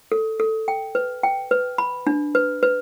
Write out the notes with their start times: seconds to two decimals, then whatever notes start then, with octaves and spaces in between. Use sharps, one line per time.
0.12 A4
0.40 A4
0.68 G5
0.95 B4
1.23 G5
1.51 B4
1.78 B5
2.07 D4
2.35 B4
2.63 B4